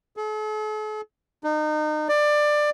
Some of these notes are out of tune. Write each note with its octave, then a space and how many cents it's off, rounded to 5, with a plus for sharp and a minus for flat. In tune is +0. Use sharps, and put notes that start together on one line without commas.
A4 -45
D#4 -30
D5 +20